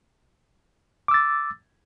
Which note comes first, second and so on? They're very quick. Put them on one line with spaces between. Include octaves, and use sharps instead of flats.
D6 E6 A6